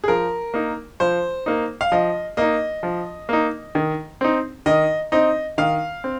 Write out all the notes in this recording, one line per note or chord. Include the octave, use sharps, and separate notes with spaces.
G#4
F3 A#4
A#3 D#4
F3 C5
A#3 D#4
F5
F3 D#5
A#3 D#4 D#5
F3
A#3 D#4
D#3
C4 D#4
D#3 D#5
C4 D#4 D#5
D#3 F5
C4